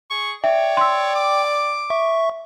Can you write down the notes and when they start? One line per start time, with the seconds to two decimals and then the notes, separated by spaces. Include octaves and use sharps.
0.11 G#4 C#6
0.44 C#5 D5 E5 G5
0.77 C6 E6
1.16 D6
1.90 E5 C#6